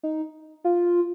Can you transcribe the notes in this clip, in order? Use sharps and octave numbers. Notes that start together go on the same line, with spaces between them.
D#4
F4